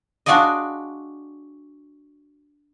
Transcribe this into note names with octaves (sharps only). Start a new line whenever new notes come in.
D4 F4 F#4 G#4 D5 D#5